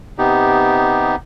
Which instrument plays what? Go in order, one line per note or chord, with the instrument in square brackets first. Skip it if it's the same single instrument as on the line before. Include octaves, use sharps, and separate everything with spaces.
[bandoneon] C3 B3 D#4 G4